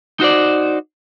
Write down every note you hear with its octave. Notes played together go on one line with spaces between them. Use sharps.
D#4 F#4 C5 D5